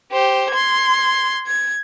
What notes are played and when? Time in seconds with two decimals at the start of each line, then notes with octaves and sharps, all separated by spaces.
0.13 G4 C5
0.51 C6 G#6
1.47 G#6